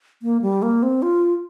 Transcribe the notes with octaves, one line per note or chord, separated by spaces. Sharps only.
A#3
G3
A#3
C4
F4